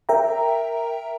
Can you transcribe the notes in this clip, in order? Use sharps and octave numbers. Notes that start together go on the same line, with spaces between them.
A#4 E5 G5 A#5